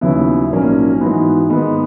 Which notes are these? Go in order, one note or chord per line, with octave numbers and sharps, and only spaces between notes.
D#2 C#3 F#3 B3 E4
A#1 G#2 F#3 A#3 C#4
G#2 E3 B3 F#4
G#2 D#3 G#3 B3